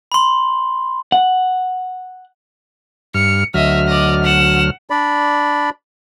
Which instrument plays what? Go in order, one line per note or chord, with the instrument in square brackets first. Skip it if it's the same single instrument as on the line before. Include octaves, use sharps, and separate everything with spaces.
[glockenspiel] B5 C6
[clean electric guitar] F#5
[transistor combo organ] G2 F6 [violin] C#7
[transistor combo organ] D2 F#3 F6 [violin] D#5 E5
[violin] D5 D#5
F#5 E7
[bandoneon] D4 D5 B5